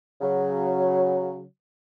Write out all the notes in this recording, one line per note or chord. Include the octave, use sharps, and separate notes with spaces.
C#3 F#3